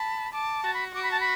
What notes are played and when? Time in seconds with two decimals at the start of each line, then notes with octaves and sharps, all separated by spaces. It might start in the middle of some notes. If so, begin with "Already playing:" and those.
Already playing: A5 B5
0.33 A5 D6
0.64 F#4 A5
0.73 B5
0.94 F#4 D6
1.03 B5
1.11 A5
1.20 B5